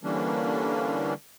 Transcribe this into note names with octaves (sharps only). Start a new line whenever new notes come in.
D3 E3 G3 A#3 C#4 D4